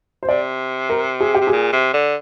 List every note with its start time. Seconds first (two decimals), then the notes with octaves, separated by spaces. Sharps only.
0.23 C5
0.28 C3 D5
0.90 A#4
1.20 G#4
1.35 G4
1.41 C3
1.47 A#2 G#4
1.73 C3
1.93 D3